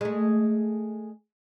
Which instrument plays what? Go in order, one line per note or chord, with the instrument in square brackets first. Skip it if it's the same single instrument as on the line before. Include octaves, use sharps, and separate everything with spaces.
[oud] G#3 A3